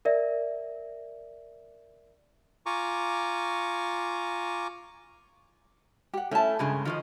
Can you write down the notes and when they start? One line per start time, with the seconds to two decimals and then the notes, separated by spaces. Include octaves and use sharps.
0.05 A#4 D5 E5
2.66 F4 G#5 A#5 C#6 D6
6.13 G4 F#5
6.31 A3 C#4 E4 A5
6.59 G2 C#3 G#3 G#4
6.85 D#3 F3 F4 D#5